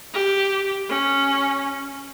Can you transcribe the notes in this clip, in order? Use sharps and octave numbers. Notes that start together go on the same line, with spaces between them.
G4
C#4